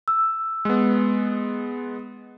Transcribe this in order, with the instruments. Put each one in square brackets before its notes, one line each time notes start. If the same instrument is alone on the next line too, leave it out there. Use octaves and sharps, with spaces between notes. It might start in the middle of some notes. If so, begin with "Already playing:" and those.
[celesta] E6
[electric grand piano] G#3 B3